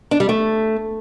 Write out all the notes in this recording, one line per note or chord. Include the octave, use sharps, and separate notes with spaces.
D4
G3
A3